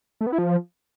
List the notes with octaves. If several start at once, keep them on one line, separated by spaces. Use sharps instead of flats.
A3
B3
E4
F3